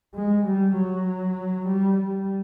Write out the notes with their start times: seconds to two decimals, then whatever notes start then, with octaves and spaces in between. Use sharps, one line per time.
0.15 G#3
0.46 G3
0.76 F#3
1.67 G3
1.97 G3